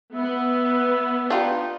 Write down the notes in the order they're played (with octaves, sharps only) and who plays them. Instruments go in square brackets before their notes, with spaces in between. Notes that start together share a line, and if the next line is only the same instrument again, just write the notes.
[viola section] B3 [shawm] E5
[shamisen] D4 F4 G4 [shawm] D#4